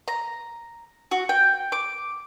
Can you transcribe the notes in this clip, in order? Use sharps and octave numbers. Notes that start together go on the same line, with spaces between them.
A#5
F#4
G5
D6